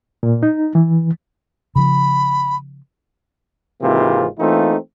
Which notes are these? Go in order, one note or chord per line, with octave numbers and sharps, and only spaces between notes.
A#2
D#4
E3
C#3 F3 B5
G#1 G#2 C3 E3 A#3 F4
E3 A3 A#3 C4 D#4 F4